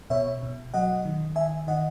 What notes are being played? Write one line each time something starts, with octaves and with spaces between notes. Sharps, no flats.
B2 C#5 E5
B2
F#3 D#5 F#5
D#3
D#3 E5 G#5
D#3 D#5 F#5